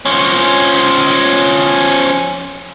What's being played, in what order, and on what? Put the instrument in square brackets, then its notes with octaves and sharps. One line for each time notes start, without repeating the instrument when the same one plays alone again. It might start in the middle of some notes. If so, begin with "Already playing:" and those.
[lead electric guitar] F3 C#4